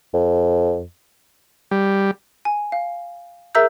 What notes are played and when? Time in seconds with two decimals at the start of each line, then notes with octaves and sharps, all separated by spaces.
0.14 F2
1.71 G3
2.45 G#5
2.72 F5
3.55 G#4 A#4 E5 A#5 E6 G6